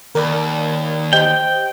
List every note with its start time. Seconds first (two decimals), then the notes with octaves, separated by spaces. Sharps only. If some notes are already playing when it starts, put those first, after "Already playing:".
0.15 D#2 A#4 D5 B5
1.13 G4 C5 D#5 G5